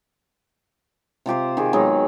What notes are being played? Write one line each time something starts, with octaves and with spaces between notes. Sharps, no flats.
C3 F4 G4 C5
D#3 G4 G#4
F#3 G#3 B3 D#4